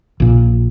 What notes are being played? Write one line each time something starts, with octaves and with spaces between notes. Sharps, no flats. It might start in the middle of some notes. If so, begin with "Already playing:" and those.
A#1 A#2